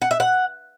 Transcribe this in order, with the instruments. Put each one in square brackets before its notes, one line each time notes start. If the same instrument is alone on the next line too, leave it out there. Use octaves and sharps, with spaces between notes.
[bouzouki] F#5
E5
F#5